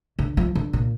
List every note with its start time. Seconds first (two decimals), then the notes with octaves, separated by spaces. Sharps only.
0.19 D3
0.37 F3
0.55 D3
0.73 A#2